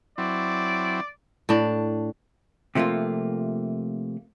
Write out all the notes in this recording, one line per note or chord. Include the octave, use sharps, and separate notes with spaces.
F#3 C4 E4 D5
A2 D4
C3 F3 A3 A#3 F4